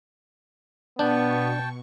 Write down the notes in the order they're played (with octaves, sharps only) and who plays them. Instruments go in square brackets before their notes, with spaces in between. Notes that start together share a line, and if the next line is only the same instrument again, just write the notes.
[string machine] B2 C#6 [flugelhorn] B3 [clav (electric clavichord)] D4 [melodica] G5 A5